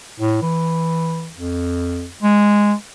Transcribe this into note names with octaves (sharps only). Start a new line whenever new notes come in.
A2
E3
F2
G#3